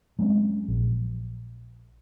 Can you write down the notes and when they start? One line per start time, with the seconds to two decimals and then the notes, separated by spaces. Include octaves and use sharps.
0.19 F#3 G#3 C4 C#4
0.68 A#1